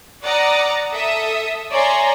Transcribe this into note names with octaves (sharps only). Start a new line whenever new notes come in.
D5 F#5 A#5 D#6
A4 E5 D#6
C#5 D5 E5 G#5 A#5 C6